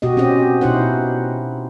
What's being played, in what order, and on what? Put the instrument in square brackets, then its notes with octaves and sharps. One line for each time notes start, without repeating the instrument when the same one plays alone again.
[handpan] B2 F#4 G4 D#5
C4 C#4 G4 D#5
B2 D#4 E4 C5 F#5